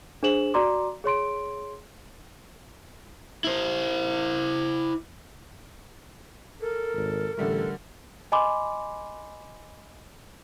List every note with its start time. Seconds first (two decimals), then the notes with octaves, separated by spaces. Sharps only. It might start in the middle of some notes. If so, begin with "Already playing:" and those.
0.23 D4 G#4 C5 E7 F#7
0.54 F#4 D5 A#5 C6 D6
1.04 G#4 C#5 C6 D7
3.44 E4 C5
6.61 A4 A#4
6.95 G#1
7.37 A1 D3 G3 A3 A4
8.32 D#5 G#5 B5 C6 D6